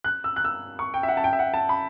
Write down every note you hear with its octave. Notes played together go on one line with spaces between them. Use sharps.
F#6
E6
F#6
E6
C#6
G5
E5
F#5
A5
G5
E5
F#5
A5
B5